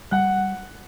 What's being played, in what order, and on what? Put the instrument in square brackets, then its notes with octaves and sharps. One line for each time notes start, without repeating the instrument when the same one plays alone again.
[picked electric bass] G3 [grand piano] F#5 F#6